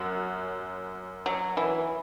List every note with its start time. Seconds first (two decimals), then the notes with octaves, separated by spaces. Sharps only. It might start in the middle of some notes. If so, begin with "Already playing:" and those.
Already playing: F#2 F#4
1.26 F#3
1.57 E3